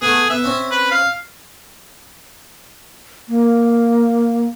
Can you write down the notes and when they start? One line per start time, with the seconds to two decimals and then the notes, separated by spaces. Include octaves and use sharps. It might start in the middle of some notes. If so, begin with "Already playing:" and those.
0.02 A3 B3 G#4
0.30 B3 E5
0.44 C4 C#4
0.71 B4
0.91 F5
3.29 A#3